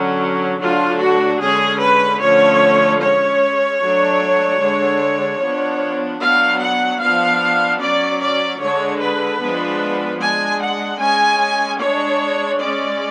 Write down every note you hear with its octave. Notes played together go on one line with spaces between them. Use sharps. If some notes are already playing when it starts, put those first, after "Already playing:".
Already playing: D3 F#3 C#4
D3 F#3 A3 D4 F4
F#4
D3 G#3 C#4 G#4
B4
D3 F3 A3 C#4 C#5
G#3 C#4 C#5
F#3 A3 D4
D3 G#3 D4
F3 B3 D4
F#3 B3 D4 F5
F#5
F3 B3 D4 F5
F#3 C#4 D5
D5
D3 G#3 D4 C#5
B4
F3 G#3 B3 D4
G#3 D4 G#5
F#5
G#3 C#4 G#5
G#3 D4 C#5
G#3 C#4 D5